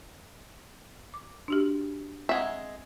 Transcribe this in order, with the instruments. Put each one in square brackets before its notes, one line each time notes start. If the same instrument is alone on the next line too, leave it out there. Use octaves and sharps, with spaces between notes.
[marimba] D6
D4 F#4 G4
[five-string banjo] G#3 E5 [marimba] C4 F#5 G#6